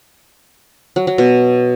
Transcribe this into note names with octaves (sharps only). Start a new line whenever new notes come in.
F#3
F#3
B2